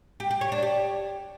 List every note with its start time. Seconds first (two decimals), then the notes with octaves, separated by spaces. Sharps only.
0.20 G4
0.31 G4
0.41 C#5
0.52 D4
0.62 G4